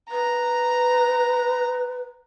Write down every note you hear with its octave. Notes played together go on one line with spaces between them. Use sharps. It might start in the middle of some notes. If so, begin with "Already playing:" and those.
B4 A#5